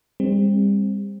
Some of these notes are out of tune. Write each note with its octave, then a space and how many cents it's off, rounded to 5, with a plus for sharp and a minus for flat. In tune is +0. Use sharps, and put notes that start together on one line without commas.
G3 +40 C4 +15